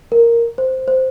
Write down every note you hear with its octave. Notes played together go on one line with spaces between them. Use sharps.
A#4
C5
C5